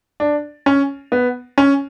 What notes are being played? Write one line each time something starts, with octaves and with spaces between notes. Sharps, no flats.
D4
C#4
B3
C#4